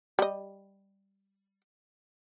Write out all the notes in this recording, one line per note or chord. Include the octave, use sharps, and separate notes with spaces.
G3 D#5